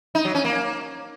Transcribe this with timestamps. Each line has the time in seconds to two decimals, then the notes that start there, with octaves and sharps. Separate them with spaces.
0.15 D#4
0.25 F#3
0.35 C#4
0.45 A#3